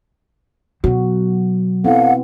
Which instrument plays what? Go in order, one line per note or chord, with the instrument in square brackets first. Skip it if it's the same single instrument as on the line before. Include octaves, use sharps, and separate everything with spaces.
[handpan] B2 F#4 [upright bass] F#3
[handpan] B3 C4 E4 [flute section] A4 F5 F#5